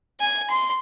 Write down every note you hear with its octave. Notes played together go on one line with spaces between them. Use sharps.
G#5
C6